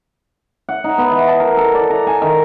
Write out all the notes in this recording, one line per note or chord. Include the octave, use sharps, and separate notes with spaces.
F#5
D#4
B3
E3
A5
A#4
A4
D5
A#5
G#5
D#3